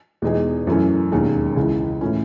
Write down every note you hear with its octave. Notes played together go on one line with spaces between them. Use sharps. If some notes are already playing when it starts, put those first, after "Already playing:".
E2 B2 G#3 D#4 G#4
F#2 E3 A3 C#4
E1 D#2 D#3 G#3 C#4
C#2 C#3 E3
A2 E3 A3 C#4